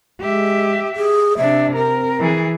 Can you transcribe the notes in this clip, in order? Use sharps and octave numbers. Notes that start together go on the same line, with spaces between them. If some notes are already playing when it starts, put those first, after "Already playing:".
G#3 G4 E5
G#4
C3 D4 E5
C4 A#4
E3 G#4